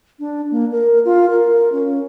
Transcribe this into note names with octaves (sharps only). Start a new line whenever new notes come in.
D4
A#3
A#4
F4
A#4
C#4